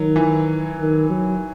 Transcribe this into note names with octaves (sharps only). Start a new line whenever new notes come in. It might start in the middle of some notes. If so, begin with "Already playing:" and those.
Already playing: D#3 F#3
E3
D#3
F#3